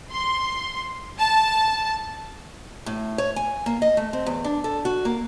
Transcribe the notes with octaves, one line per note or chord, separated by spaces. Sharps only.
C6
A5
A2
C#5
G#5
A#3
D#5
A3
C4
E2
D4
A4
F#4
A#3